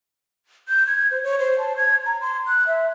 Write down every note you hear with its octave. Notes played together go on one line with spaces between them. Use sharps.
G6
G#6
C5
C#5
C5
A5
G#6
A#5
C6
F#6
E5